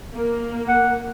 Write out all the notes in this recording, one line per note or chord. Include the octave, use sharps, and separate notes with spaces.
A#3
F#5